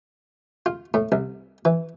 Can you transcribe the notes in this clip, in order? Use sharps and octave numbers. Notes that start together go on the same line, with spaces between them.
F4
A2
C2
E3